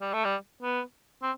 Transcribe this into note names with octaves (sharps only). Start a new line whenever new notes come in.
G3
A3
G3
B3
C4